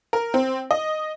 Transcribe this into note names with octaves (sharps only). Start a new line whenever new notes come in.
A#4
C4
D#5